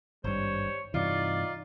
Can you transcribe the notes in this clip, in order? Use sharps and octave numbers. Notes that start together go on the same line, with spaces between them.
G#1 G2 G3 C5 C#5
G2 C3 E3 D#4 F4 D5